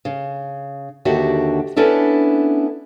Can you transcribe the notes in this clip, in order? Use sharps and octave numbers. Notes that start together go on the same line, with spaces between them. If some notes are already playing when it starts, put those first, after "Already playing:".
C#3
D#2 D3 F#4 G4 E5
B3 C#4 D4 E4 A4